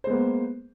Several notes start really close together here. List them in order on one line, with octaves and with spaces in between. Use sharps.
C5 G#3 B3 A#3